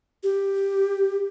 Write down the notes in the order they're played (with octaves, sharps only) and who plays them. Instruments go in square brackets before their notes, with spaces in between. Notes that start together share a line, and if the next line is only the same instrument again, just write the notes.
[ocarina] G4